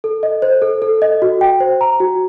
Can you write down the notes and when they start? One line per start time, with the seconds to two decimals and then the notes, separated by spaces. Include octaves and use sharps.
0.04 A4
0.23 D#5
0.42 C5
0.62 A4
0.82 A4
1.02 D#5
1.22 F#4
1.41 G5
1.60 C5
1.81 A#5
2.00 F#4